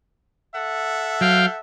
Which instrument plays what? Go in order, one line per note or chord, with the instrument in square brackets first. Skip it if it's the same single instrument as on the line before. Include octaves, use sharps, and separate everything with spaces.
[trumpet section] A4 E5 F#5
[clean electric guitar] F#3 [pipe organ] F5 G5